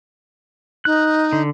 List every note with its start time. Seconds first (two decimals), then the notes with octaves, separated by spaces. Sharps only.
0.85 D#4 F#6
1.33 D3